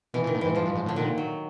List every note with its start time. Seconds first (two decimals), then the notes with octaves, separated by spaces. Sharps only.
0.14 B2 E3
0.24 A#2
0.27 D#3
0.35 A2
0.41 G#2 E3
0.55 G#2 F3
0.65 G2
0.75 G#2
0.86 A2 D3
0.96 A#2 D#3
1.18 F#3